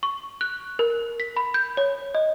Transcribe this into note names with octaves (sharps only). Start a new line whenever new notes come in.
C#6
F#6
A#4
B6
B5
G6
C#5
D#5